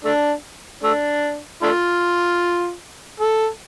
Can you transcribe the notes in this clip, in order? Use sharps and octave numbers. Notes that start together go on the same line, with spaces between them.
A3 D4
A3 D4
A3 D4 F4
A4